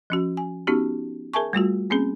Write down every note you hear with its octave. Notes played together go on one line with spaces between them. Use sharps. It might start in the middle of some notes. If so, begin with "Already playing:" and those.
F3 C#4 F#4
G#5
B3 C#4 D#4 F#4 G4
G#4 A#4 E5 G#5 A5 C#6
G3 A3 F4 F#4
A#3 C4 C#4 G#4